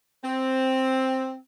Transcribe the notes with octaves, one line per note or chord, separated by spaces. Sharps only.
C4